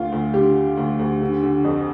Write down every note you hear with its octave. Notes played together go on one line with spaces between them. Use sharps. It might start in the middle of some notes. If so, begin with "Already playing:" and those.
Already playing: D2 D3 F4
D2
D3 G4
D3
D2
D2
D3
D3
F2